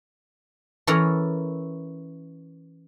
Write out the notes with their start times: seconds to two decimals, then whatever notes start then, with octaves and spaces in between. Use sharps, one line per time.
0.87 E3 C#4 A4 A#4 C#5 A#5